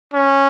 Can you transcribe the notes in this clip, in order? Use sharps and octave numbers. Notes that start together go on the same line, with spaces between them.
C#4